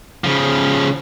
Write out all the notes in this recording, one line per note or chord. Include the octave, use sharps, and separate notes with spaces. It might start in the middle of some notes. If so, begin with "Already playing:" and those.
C#3 F3